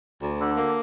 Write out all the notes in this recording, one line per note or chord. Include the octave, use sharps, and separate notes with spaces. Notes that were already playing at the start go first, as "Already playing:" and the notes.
D2
D3
A#3